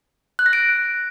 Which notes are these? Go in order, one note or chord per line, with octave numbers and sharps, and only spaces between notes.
F#6
A#6
D7